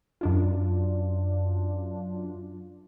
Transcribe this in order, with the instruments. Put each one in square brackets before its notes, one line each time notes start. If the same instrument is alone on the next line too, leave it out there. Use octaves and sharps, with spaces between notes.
[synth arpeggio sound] F#2 D4 F4